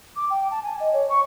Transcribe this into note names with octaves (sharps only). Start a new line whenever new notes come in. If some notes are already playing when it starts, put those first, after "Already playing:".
D6
G5
A5
G#5
D#5
C#5
C#6